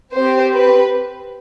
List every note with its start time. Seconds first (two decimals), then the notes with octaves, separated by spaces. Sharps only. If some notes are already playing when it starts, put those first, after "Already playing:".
0.15 C4 G4 C5
0.54 B4